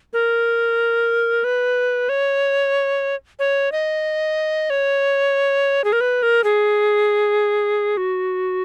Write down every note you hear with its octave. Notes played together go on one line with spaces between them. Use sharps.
A#4
B4
C#5
C#5
D#5
C#5
G#4
A#4
B4
A#4
G#4
F#4